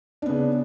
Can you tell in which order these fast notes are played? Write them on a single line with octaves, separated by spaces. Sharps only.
D4 B3 C#3